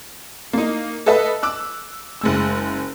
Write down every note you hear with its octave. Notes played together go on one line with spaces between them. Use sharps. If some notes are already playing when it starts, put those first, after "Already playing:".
A#3 D#4
A4 B4 D#5 E5 A5 E6
D6 E6 F#6
F#1 G#3 E6